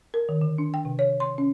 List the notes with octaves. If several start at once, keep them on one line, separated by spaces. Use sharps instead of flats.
A#4
D#3
D3
D4
G5
C3
C#5
C6
C#4